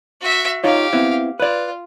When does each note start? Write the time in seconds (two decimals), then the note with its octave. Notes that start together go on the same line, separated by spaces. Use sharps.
0.21 F#4 E5
0.64 D#4 F4 G4 C#5 F5
0.93 B3 C4 E4
1.40 F4 B4 D5